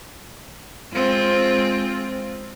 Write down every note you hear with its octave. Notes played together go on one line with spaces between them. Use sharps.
G#3 C4 F4